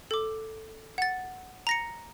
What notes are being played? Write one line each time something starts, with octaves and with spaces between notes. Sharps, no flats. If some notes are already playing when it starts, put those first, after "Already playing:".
A4 D6
F#5 A6
A#5 A#6 C#7